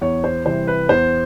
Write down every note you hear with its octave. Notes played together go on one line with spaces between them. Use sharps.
E2 C#5
C5
C3 E3 G3 C5
B4
E2 C5